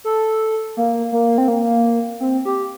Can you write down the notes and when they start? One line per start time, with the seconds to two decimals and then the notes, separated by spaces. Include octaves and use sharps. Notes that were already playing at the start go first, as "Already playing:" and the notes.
0.04 A4
0.77 A#3
1.12 A#3
1.38 C4
1.48 A#3
2.20 C4
2.45 G4